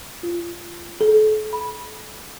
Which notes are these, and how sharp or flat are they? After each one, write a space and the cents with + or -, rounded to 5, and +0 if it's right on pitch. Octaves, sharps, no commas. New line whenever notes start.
F4 -25
A4 -35
B5 -10